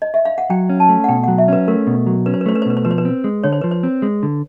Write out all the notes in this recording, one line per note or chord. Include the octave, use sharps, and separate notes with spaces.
D#5
E5
F5
F#5
F#3 G5
C#4
A5
A3
F#5
B2 G5
F#3 F#5
E5
C#4 B4
A3 A#4
B2
F#3
C#4 B4
C5
B4
A3 C5
B4
C5
B2 B4
C5
F3 B4
C5
B4
C4
G#3
D3 C#5
C5
F3 B4
C5
C4
G#3
D3